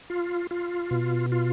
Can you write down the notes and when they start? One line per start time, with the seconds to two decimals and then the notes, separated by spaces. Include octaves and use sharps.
0.10 F4
0.51 F4
0.91 B2
1.32 F4